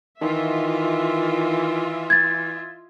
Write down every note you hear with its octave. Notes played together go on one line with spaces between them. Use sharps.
D#3 E3 F4 D#5 E5
G#6 A6